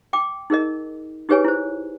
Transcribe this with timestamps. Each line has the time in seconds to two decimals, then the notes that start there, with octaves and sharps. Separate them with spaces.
0.13 G5 D6
0.50 D#4 G#4 A#4 D#5
1.29 D#4 G4 G#4 B4 C#5 G#5
1.44 E4 C5